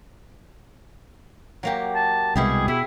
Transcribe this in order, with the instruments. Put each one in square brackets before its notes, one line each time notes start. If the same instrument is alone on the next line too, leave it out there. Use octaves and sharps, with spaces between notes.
[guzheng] F#3 A#3 G4
[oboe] A5
[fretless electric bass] C2 G#3 [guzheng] B2 E4 G4 [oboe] G#4
[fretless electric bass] B2 [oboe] E4 [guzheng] G#4